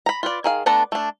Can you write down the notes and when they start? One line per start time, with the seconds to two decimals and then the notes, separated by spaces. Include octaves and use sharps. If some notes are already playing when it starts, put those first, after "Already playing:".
0.06 A#5 B5
0.23 F4 B4 D5
0.44 D#3 G#4 F5
0.66 A3 B3 D4 A4 A#5
0.92 A3 D4